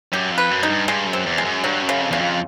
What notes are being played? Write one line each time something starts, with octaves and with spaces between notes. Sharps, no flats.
F#2 G4
F2
B4
F#2
D#4
G2
G2 G#3
F#2
C4
E2
G#3
F#2
G2 F#3
F#2
C#3
F2
E2 C#3
F2